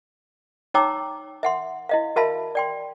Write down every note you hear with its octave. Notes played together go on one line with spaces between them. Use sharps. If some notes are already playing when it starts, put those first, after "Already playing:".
D#4 C#5 G5 A#5 D6 E6
E5 F#5 C6
E4 D#5 F5
F#4 A#4 E5 F5 A5 B5
D5 G5 C6